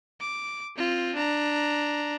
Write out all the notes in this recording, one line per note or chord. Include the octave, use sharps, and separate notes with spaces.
D6
C4 F4
D4 A#5